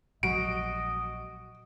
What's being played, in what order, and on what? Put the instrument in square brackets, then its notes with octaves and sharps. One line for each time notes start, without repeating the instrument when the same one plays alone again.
[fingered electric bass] A#1 F#3 G#3 [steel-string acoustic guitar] F#4 [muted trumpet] D#5 [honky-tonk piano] D7